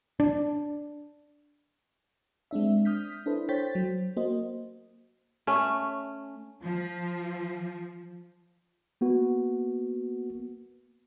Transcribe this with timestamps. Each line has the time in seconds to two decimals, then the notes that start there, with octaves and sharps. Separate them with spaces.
0.20 D4
2.51 G#3 C4 D4 E5
2.85 D#6 F6 G6 B6
3.26 D4 E4 A4 B4 C5
3.49 C5 C#5 G5 G6 A6 B6
3.75 F#3
4.17 A#3 F#4 C5 D#5
5.47 A3 C#4
6.64 F3
9.01 A#3 B3 F#4